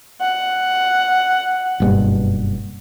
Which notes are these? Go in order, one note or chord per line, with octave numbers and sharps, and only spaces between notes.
F#5
F#1 G2 B2